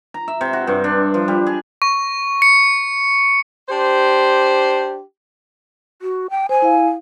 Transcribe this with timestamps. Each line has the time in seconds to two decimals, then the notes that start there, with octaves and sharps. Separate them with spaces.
0.14 A#5
0.28 E5
0.41 C3
0.53 F#4
0.67 G2
0.84 D4
1.14 F3
1.28 G3
1.47 G#4
1.82 C#6
2.42 C#7
3.69 D4 G4 C5
6.02 F#4
6.30 G5
6.49 C5 G#5
6.62 E4 F5